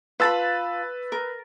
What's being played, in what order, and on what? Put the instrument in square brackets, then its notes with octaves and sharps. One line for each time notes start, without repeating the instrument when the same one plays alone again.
[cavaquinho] F4 A5 B5 [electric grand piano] B4 E6 A6
[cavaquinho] A#4